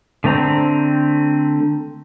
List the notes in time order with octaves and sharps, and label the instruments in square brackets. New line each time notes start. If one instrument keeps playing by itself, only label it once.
[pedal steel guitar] D3 A3 C4 A#5